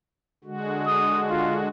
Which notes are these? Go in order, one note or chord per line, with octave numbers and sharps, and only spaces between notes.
D3 G#3 F#4
D#6
F4